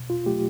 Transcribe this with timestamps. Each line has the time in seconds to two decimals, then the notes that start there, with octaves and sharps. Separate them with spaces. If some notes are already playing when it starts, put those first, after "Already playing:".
Already playing: B2
0.10 F4
0.26 F#3 A3 G4